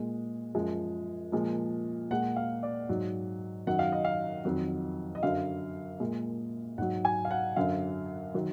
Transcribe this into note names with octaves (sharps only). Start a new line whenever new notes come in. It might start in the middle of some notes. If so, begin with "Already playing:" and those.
Already playing: A#2 G#3
F#2 F3 G#3
A#2 F3 G#3
A#2 G#3 F#5
F5
D5
G#2 F#3
F#2 D#3 F#3 F#5
F5
D#5
F5
F2 D#3 F#3
D#5
F#2 D3 F#3 F5
A#2 G#3
G#2 F#3 F#5
G#5
F5
F#5
F#2 D3 F#3 F5
D#3 F#3